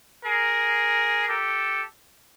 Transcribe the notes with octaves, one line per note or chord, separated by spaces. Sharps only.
G#4 A#4
G4 A4